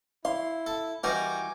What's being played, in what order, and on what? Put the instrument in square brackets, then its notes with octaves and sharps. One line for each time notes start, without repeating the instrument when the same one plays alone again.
[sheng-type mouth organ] E4 [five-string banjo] F5 [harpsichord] C6
[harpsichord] A4
[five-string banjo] E3 F#4 [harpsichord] G3 D#4 A#4 [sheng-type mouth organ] G#5 D6